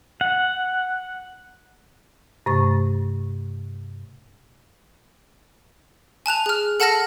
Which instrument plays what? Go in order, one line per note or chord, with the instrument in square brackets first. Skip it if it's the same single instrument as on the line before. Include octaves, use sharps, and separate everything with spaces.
[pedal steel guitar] F#5
[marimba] G2 C3 A3 C#6 A6
[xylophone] G#5 A5 F#6 F7
G#4 F6
A4 F#5 A5 F6 A#6 C#7